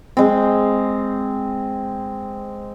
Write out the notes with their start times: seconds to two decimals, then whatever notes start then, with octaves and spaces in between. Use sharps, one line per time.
0.17 G#3 C4